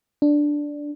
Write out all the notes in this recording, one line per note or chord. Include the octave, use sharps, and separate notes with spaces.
D4